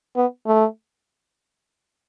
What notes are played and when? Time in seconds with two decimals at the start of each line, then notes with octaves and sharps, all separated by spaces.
0.16 B3
0.46 A3